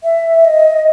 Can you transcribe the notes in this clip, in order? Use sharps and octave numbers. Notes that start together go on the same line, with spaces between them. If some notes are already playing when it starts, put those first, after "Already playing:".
E5
D#5